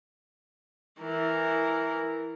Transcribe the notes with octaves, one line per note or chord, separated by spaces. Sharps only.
E3 A#4